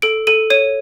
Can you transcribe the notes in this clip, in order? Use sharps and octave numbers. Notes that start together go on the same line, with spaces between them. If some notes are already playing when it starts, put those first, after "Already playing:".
A4 D7
A4 D#7
C#5 D#7